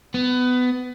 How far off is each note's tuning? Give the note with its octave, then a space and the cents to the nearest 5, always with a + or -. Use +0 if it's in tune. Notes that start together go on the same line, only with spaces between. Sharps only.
B3 +20